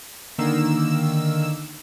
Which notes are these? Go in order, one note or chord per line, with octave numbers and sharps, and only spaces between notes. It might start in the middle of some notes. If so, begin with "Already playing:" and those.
D3 D#3 A#3 E6